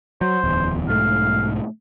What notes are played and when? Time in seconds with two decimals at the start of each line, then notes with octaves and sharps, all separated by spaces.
0.21 F#3 C5
0.44 D1 E2
0.89 B1 G#2 A3 F5